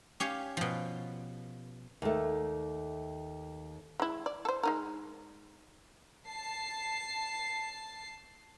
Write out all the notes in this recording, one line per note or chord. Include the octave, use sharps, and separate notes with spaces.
C#4 G4 C#5 F5
B2 F3
D#2 A3
G#3 E4
D5
A4 C5
G#3 D#4 A#4
A5 C7